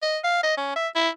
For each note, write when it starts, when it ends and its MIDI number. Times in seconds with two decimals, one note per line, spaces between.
0.02 0.18 75
0.24 0.38 77
0.43 0.56 75
0.57 0.72 61
0.76 0.88 76
0.95 1.09 64